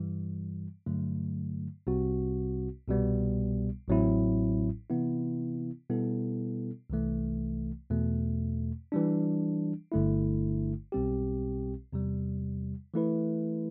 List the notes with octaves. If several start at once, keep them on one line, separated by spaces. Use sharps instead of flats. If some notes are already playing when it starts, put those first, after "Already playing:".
Already playing: G2 E3 G3
G2 D3 F#3 A3
C2 C3 G3 C4 F#4
C2 B2 G3 B3
A1 A2 F#3 C4 E4
C3 E3 B3 E4
B2 G3 B3 E4 A4
C2 C3 E3 A3
E2 B2 A3
E3 G3 D4
G1 G2 D3 A3 E4
B1 B2 G3 C4 G4
E2 C3 G3
E3 A3 E4 B4